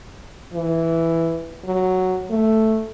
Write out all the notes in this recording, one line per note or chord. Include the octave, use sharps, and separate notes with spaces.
E3
F#3
A3